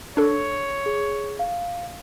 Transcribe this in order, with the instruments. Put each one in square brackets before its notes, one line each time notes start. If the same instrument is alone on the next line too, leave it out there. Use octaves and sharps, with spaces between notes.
[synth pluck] D4 A4 [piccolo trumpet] C#5
[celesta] G#4
F5